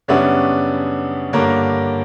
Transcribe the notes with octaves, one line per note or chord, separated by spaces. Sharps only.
F#2 C#3 G3 B3 D4 C#5 E5
G2 D3 A#3 A#4 C#5